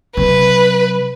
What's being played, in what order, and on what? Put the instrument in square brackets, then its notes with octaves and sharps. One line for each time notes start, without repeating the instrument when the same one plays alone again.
[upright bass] C3 F#3 [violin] B4